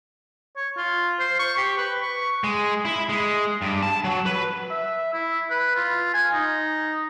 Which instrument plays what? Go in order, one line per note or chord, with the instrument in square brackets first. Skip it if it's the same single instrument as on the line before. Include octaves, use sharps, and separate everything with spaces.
[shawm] C#5
F4
C5
C#6
G4
B4
C#6
[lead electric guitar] G#3
E4
G#3
G2
A5
F#3
B4
[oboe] E5
E4
B4
F4
G#5
D#4